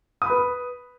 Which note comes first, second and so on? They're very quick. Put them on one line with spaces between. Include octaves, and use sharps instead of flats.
D#6 B5 B4